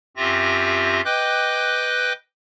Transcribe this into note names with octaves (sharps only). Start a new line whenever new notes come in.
F#2 C4 F4 G4 E5 A#6
B4 D#5 G5 D6 F#6 G6